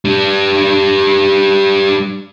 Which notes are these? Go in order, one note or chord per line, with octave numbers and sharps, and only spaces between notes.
G3 D4